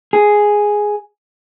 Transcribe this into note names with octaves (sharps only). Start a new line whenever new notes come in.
G#4